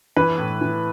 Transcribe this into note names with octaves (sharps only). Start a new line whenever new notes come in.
E3 B4
A2
E3